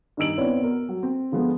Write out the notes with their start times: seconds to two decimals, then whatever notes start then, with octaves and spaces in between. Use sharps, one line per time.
0.17 G2 D#3 D#4 E6 D7 F#7
0.38 B3 C4 D4 E4 B4 C#5
0.61 B2 A#4
0.89 F#3
1.03 C4
1.32 D3 F3 G#3 B3